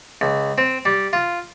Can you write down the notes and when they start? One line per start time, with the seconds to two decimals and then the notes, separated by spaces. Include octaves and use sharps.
0.21 C#2
0.58 C4
0.85 G3
1.13 F4